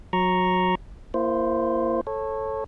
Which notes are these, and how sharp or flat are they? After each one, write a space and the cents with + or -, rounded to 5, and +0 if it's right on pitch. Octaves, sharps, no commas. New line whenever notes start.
F#3 -25 A#5 +0 C#6 -5
A#3 +0 E4 +35 C5 +0
A4 +0 C#5 -20